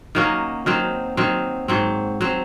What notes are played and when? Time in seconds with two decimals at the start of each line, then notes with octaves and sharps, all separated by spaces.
0.15 D#3 F#3 A#3 C#4
0.66 D#3 F#3 C4
1.17 D#3 F#3 C4
1.68 G#2 F#3 C4
2.21 F#3 C4